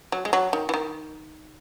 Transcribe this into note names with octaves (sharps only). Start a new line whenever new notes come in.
F#3
G#3
F#3
D#3
E3
D#3